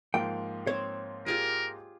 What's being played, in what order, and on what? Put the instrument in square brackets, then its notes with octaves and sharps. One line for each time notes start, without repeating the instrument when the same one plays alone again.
[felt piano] G#2 F3 A#3 [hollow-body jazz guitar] G5
[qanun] C4 [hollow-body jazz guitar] C#5
[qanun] F4 G4 G#4 [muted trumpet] A#4